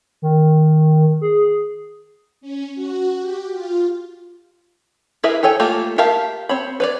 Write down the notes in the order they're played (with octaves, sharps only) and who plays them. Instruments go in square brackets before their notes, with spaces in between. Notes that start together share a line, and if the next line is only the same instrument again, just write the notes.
[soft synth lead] D#3
G#4
[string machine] C#4
F#4
G4
F4
[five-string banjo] E4 G#4 A#4 B4 E5
G4 A4 C#5 G5 G#5
A3 A#3 F4 G4
G4 A#4 E5 F5 A5
C4 C#5 B5
B4 C#5 D5